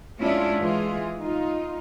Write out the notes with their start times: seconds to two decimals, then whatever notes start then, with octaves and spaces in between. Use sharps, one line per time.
0.20 G#3 C#4 D4 E4 F4
0.57 E3 G#3 E4 F4 G#4
1.18 D#4 F4